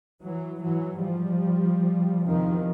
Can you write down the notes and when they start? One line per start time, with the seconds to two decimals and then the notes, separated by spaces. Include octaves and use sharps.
0.22 E3 F#3
0.62 G#2 E3 F#3
1.03 F3 G3
2.25 E2 C3 D#3 F3